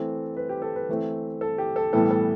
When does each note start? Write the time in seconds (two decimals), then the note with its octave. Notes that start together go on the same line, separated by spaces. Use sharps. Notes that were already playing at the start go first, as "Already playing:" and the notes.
Already playing: E3 A3 C4 A4
0.37 B4
0.49 G4
0.62 A4
0.76 B4
0.89 E3 A3 C4
1.41 A4
1.58 G4
1.76 A4
1.93 A2 E3 G3 B3 A4
2.11 A4